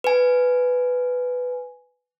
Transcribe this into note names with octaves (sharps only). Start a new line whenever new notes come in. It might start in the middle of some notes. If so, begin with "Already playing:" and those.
B4 G#5